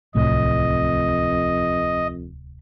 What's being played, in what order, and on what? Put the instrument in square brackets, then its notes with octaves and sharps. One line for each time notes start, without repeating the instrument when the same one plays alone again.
[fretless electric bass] D1 C2 A2 [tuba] F2 [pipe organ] D#5